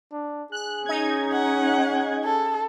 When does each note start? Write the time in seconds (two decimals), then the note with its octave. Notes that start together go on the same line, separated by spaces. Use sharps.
0.12 D4
0.52 G#4 F#6
0.86 C#4 D#4 G#6
1.33 F#5
2.25 A4